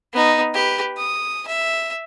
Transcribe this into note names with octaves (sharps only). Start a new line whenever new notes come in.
B3 D#4
G4 B4
D#6
E5